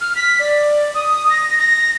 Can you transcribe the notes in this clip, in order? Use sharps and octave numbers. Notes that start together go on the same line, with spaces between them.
F6
B6
D5
D#6
A#6
A#6